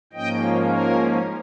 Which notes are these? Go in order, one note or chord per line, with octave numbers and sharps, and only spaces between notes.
G#2 F3 A#3 C#4 D#5 G5
A#4